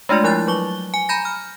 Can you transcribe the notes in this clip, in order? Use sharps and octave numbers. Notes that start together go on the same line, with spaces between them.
G#3 A3 D4 F4 D5
F3 E4 F#6 A6
F#3 C#6 G7
G#5
G#5 A#5 B5 G6 A#6
F6